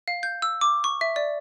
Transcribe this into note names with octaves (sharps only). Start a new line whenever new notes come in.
F5
G6
E6
D6
C#6
E5
D5